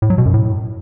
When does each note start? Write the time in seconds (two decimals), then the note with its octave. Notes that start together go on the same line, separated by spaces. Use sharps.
0.02 A2
0.10 F#3
0.18 B2
0.26 F#2
0.34 A2